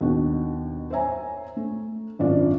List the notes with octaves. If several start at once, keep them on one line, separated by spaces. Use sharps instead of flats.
D#2 B2 D4 F#4
C5 C#5 E5 G#5 A#5
A3
G#1 F#2 D4 F4 D5